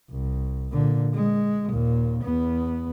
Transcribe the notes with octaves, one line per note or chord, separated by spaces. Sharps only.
C2
A#2 D3
G#3
D#2 A#2
E2 B3